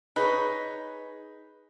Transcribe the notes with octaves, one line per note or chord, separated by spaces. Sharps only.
D#4 G#4 B4 C#5